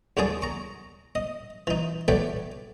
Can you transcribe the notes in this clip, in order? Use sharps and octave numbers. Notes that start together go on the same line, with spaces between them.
D#2 G#2 F#3 D4 G#4 D5
A#5 C#6
D#5
E3 D#4
F#3 A3 B4 D5 G5